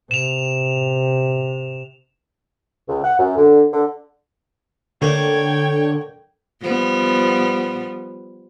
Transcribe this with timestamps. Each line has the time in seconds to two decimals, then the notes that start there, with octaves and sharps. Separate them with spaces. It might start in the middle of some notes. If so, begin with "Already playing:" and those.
0.11 C3 E7 F7
2.89 C#2
3.03 F#5
3.19 F#2
3.37 D3
3.73 D3
5.02 D3 A3 A#3 C#5 G5 G#6
6.61 F3 G3 B3